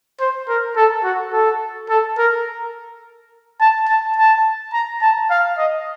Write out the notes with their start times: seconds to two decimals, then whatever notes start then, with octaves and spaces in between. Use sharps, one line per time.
0.20 C5
0.48 A#4
0.76 A4
1.04 F#4
1.33 A4
1.89 A4
2.18 A#4
3.61 A5
3.88 A5
4.17 A5
4.74 A#5
5.02 A5
5.30 F5
5.58 D#5